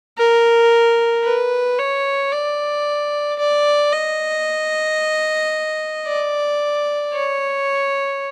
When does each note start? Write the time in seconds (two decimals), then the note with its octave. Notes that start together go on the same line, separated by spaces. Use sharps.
0.18 A#4
1.24 B4
1.79 C#5
2.31 D5
3.39 D5
3.92 D#5
6.07 D5
7.13 C#5